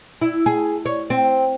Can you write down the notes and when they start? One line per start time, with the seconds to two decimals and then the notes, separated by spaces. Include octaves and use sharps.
0.21 E4
0.46 G#4
0.86 C#5
1.10 C4